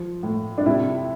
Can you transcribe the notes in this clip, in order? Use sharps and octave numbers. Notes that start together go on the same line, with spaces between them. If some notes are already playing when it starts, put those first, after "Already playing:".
Already playing: F3
A2
D4
C3 E4